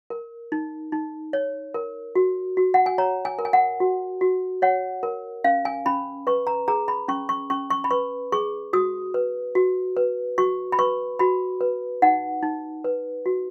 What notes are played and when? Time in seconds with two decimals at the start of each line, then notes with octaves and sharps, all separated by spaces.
0.10 A#4
0.52 D#4
0.92 D#4
1.33 C#5
1.74 A#4
2.15 F#4
2.57 F#4
2.74 F#5
2.86 G#5
2.98 C#5 A#5
3.25 G#5
3.39 A#4
3.45 G#5
3.53 F#5
3.80 F#4
4.21 F#4
4.62 C#5 F#5
5.03 A#4
5.44 C#4 F5
5.65 G#5
5.86 C#4 B5
6.27 B4 C#6
6.47 A#5
6.68 G#4 A#5
6.88 B5
7.08 C#4 C#6
7.29 C#6
7.50 C#4 C#6
7.70 C#6
7.84 B5
7.91 B4 C#6
8.32 G#4 C#6
8.73 F#4 D#6
9.14 B4
9.55 F#4
9.97 B4
10.38 F#4 C#6
10.72 B5
10.79 B4 C#6
11.19 F#4 B5
11.61 B4
12.02 D#4 F#5
12.43 D#4
12.84 B4
13.26 F#4